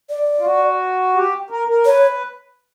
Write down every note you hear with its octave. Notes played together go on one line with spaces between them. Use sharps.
D5
F4
F#4
G4
A#4
A#4
B4 C#5